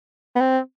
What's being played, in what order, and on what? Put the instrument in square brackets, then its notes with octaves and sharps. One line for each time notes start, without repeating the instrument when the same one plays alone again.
[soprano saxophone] B3
C4